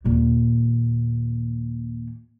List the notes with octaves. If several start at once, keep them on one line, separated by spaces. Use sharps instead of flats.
D#2 A#2